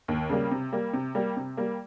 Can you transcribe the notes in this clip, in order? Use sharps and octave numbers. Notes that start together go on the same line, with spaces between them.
D#2
C#3 G3 A#3
C3
G3 A#3
C3
G3 A#3
C3
G3 A#3